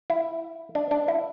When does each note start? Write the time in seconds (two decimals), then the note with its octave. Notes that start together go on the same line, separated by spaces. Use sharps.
0.10 E4
0.75 D4
0.91 D4
1.08 E4